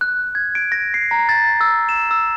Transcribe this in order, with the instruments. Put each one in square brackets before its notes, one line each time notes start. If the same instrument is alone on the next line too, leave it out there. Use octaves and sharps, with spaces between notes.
[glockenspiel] F#6
G#6
D7
A#6
C7
A#5
A6
E6
E7
E6